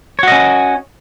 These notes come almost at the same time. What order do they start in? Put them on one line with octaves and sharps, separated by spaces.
C#5 F#4 D#5 C#4